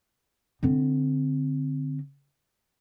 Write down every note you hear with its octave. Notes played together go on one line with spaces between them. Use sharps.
D3 C4